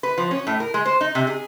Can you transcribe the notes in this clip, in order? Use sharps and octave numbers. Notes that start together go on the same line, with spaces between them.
B4
F3
C#4
A2
A#4
G#3
C5
D#4
C3
G#4